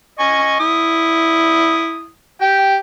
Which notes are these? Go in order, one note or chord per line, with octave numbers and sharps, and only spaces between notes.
D#5 G#5 C#6
E4 D#6
G4 G5